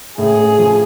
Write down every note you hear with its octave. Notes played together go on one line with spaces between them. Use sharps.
A2 G#4
A3
F3